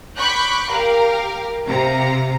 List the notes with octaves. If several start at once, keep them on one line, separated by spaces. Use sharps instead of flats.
B5 C#6 D6 F#6 G6
G4 A#4 F5
C3 F5 A#5